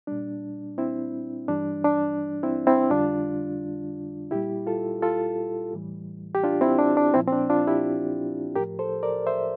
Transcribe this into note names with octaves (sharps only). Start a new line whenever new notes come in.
A#2 G3 D4
C4 E4
G2 E3 G3 D4
D4
C4 E4
C4 E4
F2 D3 G3 D4 F4
A#2 G3 E4 G4
F4 A4
F4 A4
A2 E3 G3
G4
D4 F4
C4 E4
D4
D4
A#2 F3 C4 E4
C4
D4
D4 F4
E4 G4
A2 F3 G4 A#4
A4 C5
A#4 D5
C5 E5